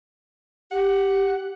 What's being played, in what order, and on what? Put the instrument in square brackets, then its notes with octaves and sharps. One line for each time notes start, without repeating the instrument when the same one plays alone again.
[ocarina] G4 [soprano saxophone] F#5